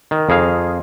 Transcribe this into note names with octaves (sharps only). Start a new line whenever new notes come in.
D#3
F2 G#4 F5